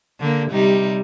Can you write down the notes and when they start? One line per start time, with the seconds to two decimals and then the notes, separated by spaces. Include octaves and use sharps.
0.20 D3 A#3
0.51 C3 G3 D#4